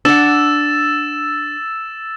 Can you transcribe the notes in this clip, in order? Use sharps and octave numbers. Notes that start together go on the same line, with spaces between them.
D4 F#5 E6 A6 E7